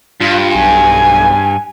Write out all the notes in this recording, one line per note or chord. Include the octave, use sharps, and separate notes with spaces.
G2 F4
B1 G#5